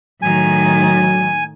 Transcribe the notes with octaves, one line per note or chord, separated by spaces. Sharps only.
A2 D#3 F#3 G#5